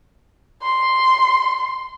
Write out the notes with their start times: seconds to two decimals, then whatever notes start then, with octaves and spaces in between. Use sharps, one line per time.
0.63 C6